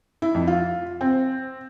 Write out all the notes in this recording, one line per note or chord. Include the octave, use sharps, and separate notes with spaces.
E4
F2
F4
C4